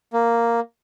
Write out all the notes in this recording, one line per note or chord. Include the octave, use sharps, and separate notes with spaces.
A#3